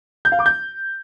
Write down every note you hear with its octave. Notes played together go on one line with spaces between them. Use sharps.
G6
F5
D6
G6